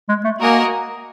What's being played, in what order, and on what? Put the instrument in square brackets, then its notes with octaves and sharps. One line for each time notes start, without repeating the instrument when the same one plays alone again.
[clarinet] G#3
A3
[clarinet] A#3 [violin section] F#4 A#4 D#5 G#5